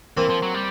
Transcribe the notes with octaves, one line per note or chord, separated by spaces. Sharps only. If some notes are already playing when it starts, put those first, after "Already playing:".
E3 A#3 C4
F3
F#3
G3